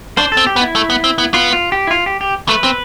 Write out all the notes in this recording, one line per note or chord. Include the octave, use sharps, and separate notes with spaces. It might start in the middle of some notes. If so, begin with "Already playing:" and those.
D4 C5
A4
C4
G4
B3
E4
A3
B3
C4
B3
B3 F4
F4
G4
E4
F4
G4
G4
A3 B4
C4